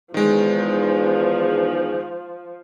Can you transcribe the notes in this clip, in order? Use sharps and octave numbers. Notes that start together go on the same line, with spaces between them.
E2 D#3 F3 G#3